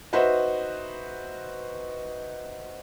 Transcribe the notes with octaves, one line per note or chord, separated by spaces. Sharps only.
D#4 F#4 B4 C5 E5